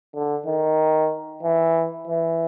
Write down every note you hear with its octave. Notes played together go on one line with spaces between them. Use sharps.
D3
D#3
E3
E3